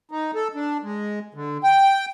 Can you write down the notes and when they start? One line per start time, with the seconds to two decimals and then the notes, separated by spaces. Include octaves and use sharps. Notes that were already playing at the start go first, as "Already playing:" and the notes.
0.11 D#4
0.35 A4
0.55 D4
0.83 G#3
1.34 D3
1.64 G5